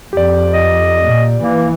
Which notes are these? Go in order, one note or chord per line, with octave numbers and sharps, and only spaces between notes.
F2 G4 D5
D#5
A#2
E3 A#3